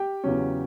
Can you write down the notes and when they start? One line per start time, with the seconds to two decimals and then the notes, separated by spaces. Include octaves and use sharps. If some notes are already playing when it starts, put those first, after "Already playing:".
Already playing: G4 G5
0.24 E2 C#3 F#3 C#4